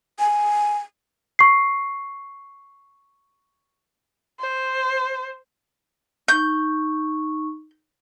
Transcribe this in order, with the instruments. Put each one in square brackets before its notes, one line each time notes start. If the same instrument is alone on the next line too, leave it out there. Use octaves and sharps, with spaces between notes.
[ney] G#5
[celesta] C#6 C7
[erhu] C5
[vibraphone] D#4 C#6 [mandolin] G6